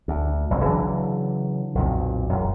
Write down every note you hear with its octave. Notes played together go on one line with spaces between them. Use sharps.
D2
F1 C2 F#2
C#3 E3 F#3 D4
B1 F2 A#2
E1 F#2